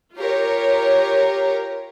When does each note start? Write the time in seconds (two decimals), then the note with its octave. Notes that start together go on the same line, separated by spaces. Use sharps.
0.15 F4 G4 A#4 C#5